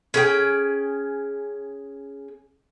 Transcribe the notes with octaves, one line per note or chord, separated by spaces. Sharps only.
C#4 G#4 G5